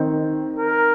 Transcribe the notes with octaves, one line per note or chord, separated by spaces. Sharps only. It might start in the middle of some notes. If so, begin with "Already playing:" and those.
Already playing: D#3 C4 D#4
A#4